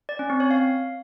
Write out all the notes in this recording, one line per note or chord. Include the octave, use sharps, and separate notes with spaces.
D5
C#4
C4
C#5
F5